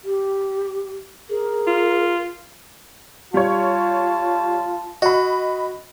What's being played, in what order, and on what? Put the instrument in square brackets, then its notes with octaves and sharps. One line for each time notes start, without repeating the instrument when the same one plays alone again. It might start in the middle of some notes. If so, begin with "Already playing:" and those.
[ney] G4
[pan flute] G#4 [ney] A#4
[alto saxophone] F4
[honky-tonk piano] G3 C#5 [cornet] F4 [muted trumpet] A5
[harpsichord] F#4 [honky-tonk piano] D#5 B5